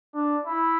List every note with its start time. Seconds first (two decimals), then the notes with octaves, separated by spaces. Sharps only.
0.14 D4
0.45 E4